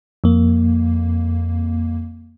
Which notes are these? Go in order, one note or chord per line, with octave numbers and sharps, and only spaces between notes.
F2 A#3